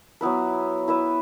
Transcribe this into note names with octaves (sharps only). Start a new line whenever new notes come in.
F#3 B3 E4 B4
E4 B4 E5